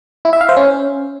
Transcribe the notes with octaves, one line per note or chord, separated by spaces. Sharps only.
E4
E5
F5
C5
C#4